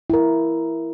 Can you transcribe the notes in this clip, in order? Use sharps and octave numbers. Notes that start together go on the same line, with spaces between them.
E4 A#4